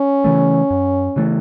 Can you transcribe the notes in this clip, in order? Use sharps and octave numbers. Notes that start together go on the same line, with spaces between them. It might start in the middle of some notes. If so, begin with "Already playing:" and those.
Already playing: C#4
C#3 E3 A3
F#2
C#3 E3 A3